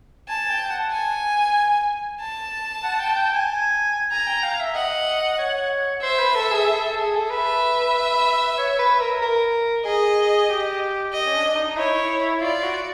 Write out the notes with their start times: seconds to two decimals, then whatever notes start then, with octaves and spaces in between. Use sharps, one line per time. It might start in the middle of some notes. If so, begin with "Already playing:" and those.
0.28 G#5 A5
0.49 G5
0.71 F#5
0.92 G#5
2.20 A5
2.83 F#5
3.00 G5
3.15 G5
3.32 G#5
4.11 G#5 A#5
4.27 G5
4.43 F5
4.60 E5
4.74 D#5 F#5
5.39 C#5
6.02 C5 E5
6.19 B4
6.35 A4
6.51 G#4
6.66 A4
6.82 A4
6.99 G#4
7.15 A4
7.30 B4 E5
7.94 B4
8.58 C#5
8.79 B4
9.00 A#4
9.22 A#4
9.85 G#4 D#5
10.49 G4
11.13 D#5
11.25 C#4
11.35 D4
11.46 D4
11.55 D#4
11.77 E4 C#5
12.41 F4 D5
12.63 F#4